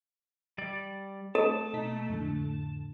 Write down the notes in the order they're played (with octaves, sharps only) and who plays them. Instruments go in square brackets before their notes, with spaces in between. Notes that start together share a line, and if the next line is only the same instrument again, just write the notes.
[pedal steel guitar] G3 D5
[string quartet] A3 [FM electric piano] C4 [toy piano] A4 [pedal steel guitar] A5
[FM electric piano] B2 D#4 B6
F2 A2 D3